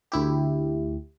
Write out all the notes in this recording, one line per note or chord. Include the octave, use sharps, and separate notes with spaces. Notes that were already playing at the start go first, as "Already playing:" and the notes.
D2 E4 G4